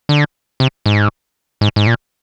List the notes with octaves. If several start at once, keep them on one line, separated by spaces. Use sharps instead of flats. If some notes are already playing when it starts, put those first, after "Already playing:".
D3
C3
G#2
G#2
G#2
A#2